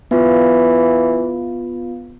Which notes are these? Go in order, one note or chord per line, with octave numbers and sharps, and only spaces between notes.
E3 B3 F4